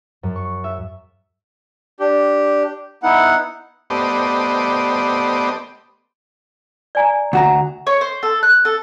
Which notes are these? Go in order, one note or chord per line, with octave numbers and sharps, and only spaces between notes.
F#2
C#6
E5
D4 G4
B3 D#4 E4 F#5
A3 B3 G4 C5 D5 D#5
D5 G#5 A#5
D2 F#4 F#5 A#5
C#5
C5
A4
F#6
A4